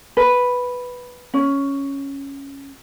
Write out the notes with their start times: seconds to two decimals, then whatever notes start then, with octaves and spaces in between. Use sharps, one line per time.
0.17 B4
1.34 C#4